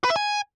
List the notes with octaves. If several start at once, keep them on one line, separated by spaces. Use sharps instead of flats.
B4
E5
G#5